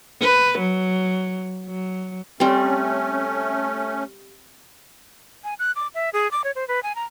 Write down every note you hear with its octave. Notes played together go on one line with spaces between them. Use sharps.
B4
F#3
F#3
G3 A3 C4 C#4
G#5
F#6
D6
E5
G#4
D6
C#5
C5
B4
G#5
A#5